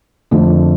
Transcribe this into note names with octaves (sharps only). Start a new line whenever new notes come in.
F2 D3 A3